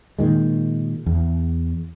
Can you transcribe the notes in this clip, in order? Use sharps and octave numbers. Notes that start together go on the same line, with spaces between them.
A#2 D#3 G#3
E2